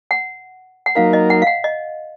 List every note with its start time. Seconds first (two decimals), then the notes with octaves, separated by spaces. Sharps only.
0.11 F#5
0.86 F#5
0.95 F#3 A#3 D#4 A#4 F5
1.13 D#5
1.30 F#5
1.42 F5
1.47 F#5
1.64 D#5